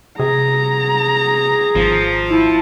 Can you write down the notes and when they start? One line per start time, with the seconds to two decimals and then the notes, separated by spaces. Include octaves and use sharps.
0.19 C3 G#4 A#5
1.75 G#1 F3
2.28 E4 A5